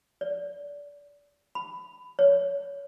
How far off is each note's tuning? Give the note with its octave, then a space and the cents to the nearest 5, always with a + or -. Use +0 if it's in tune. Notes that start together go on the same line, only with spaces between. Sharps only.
D5 -25
B5 +20
C#5 +25